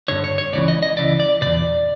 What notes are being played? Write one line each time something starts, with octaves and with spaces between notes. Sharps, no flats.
G2 D3 C#5
C#5
C#5
C#2 C#3 E3 D5
D#5
D#5
C#2 C#3 E3 D5
D5
E2 B2 D5